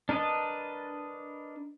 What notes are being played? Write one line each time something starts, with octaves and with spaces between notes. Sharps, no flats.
D4 A#4 B4 D#5 A5